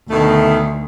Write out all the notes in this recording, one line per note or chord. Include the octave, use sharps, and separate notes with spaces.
D2 B2 D#3 A3